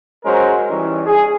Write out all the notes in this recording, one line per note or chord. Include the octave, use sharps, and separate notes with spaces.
F#3 G#3 C#4 A#4 C5
E3 G3 C#4 D#4
G#4